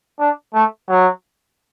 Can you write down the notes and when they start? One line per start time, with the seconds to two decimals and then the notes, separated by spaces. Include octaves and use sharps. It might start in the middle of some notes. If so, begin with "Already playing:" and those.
0.20 D4
0.54 A3
0.88 F#3